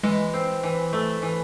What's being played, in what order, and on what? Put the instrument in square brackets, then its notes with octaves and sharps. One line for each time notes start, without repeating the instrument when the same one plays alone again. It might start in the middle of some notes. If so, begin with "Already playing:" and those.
[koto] E3 [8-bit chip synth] G#3
[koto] C4
E3
A3
E3